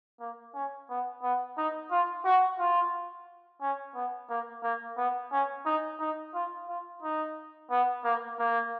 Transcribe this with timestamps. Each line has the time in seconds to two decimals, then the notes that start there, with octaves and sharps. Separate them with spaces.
0.21 A#3
0.55 C#4
0.90 B3
1.23 B3
1.58 D#4
1.92 F4
2.25 F#4
2.60 F4
3.62 C#4
3.95 B3
4.30 A#3
4.63 A#3
4.98 B3
5.32 C#4
5.66 D#4
6.00 D#4
6.35 F4
6.69 F4
7.03 D#4
7.71 B3
8.05 A#3
8.39 A#3